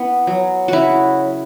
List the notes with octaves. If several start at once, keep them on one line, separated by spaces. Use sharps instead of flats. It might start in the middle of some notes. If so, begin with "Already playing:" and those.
Already playing: B3 E4
F#3
C#3 E4 F#4